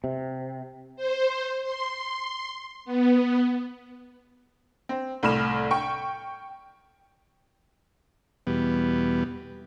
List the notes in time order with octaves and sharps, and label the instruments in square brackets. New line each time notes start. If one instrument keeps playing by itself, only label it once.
[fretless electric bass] C3
[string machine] C5
C6
B3
[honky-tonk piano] C4
C2 A2 B5 F6 E7
G5 C#6
[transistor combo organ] E2 B2 G3 B3